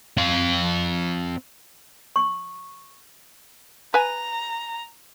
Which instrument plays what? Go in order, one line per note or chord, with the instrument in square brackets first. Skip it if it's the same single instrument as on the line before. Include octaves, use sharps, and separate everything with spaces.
[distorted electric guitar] C4 F5
[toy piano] C#6
[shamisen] B4 G#5 [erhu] A#5